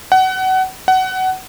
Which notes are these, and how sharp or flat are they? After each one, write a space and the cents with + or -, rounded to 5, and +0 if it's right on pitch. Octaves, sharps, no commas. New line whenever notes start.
F#5 +25
F#5 +20